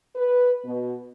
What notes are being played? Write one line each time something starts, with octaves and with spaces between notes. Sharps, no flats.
B4
B2